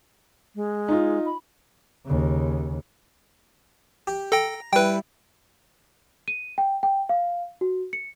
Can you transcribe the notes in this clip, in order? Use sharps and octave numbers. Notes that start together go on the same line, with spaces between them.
G#3
D#4 F4
B5
D#2 C#3
G4
A4 G5 A#5
G3 E4 B4 G5
D#7
G5
G5
F5
F#4
C#7